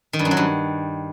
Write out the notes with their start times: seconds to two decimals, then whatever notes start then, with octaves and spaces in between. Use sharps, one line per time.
0.13 D#3
0.19 G2
0.25 F#2
0.31 F#3
0.37 G2